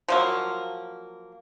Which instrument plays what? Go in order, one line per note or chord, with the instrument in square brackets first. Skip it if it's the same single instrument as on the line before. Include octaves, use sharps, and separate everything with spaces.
[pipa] F3 F#3 A#3